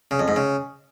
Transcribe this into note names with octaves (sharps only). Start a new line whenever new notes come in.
C#3
F2
G#2
C#3